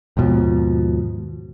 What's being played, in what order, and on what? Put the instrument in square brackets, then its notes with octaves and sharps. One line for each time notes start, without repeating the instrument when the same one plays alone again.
[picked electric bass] D#2 G#2 B2 F3